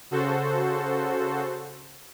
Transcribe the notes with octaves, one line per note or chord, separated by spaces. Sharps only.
C#3 F#4 A4 C5